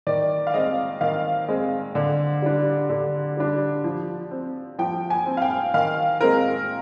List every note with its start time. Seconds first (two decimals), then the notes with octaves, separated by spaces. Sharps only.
0.07 D#3 D5
0.47 F5
0.54 G#3 C4 D#5
1.01 D#3 F5
1.49 G#3 C4
1.95 D3
2.42 G3 D4
2.90 D3
3.37 G3 D4
3.84 F3
4.31 C4
4.79 F3 G5
5.10 G#5
5.26 C4
5.37 F5
5.42 G5
5.74 D#3 F5
6.21 G#3 C4 A#4